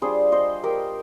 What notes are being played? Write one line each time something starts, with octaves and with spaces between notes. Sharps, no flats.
G3 D4 F4 G#4 C5
C5 D#5
G4 A#4